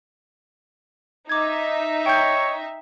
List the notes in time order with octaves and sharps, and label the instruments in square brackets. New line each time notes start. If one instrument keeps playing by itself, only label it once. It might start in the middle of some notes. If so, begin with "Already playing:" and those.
[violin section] D#4 E5 [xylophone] D6 G#6
[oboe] C#5 [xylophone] G5 G6